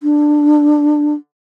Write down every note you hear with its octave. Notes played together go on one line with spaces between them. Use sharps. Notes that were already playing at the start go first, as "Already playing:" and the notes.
D4